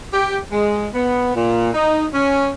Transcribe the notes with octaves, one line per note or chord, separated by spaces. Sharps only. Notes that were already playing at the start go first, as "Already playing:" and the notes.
G4
G#3
B3
A#2
D#4
C#4